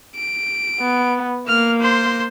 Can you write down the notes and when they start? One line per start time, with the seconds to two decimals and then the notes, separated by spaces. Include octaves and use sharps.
0.16 D7
0.80 B3
1.48 A#3 F6
1.81 C5 C6